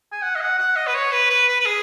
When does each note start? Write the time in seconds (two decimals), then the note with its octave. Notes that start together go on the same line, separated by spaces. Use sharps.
0.12 G#5
0.22 F#5
0.36 D#5
0.40 F#5
0.59 F#5
0.76 D#5
0.87 B4
0.94 C#5
1.12 B4
1.30 B4
1.48 B4
1.60 B4
1.65 G#4